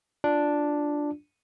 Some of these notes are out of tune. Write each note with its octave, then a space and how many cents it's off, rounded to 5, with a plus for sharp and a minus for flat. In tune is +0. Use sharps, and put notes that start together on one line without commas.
D4 +0 F4 +0